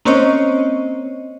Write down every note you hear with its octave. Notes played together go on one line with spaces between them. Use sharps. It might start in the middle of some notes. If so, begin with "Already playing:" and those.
A#3 C4 C#4 C5 C#5 D#5